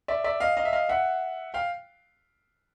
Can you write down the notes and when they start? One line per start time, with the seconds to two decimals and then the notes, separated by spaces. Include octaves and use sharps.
0.08 D5 E5
0.24 D5 E5
0.40 D#5 F5
0.57 D#5 F5
0.65 E5
0.73 D#5 F5
0.89 E5 F#5
1.54 F5 G5